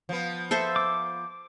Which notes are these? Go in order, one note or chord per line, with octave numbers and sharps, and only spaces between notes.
F3 B3
A4 C5 E5
D6